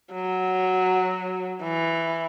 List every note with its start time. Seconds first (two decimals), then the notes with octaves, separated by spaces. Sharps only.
0.13 F#3
1.63 E3